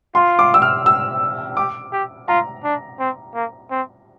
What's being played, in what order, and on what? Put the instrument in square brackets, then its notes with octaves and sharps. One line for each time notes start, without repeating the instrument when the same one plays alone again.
[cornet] F4 [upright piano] C6
[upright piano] D6
E6
F6
E6
[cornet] G4 [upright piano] D6
[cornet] G4
[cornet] F4 [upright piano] A#5
[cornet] D4
C4
A#3
C4